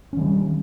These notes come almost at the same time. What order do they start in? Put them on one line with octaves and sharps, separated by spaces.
C#4 D#3 G3